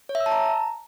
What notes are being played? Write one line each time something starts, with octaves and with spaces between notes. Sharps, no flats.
C#5
E5
E6
A5
A#5